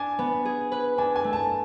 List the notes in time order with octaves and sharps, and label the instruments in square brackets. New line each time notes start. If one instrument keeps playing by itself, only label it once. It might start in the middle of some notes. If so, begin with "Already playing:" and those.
Already playing: [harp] D4 [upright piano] G#5
[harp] B3
G#4
B4
[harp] D4 [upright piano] G#5
[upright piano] G#5
[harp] A3
[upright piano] A5